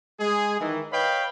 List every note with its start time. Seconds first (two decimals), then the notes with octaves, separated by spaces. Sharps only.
0.20 G#3 G#4
0.60 D#3 E3
0.92 B4 C#5 D#5 F5 G5 B5